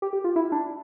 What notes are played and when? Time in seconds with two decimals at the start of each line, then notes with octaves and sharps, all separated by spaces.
0.02 G4
0.13 G4
0.24 F4
0.36 E4
0.52 D4